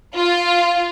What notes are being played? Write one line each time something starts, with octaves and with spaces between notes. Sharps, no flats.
F4